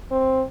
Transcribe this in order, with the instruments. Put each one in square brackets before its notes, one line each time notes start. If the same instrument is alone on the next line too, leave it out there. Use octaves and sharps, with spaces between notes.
[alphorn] C4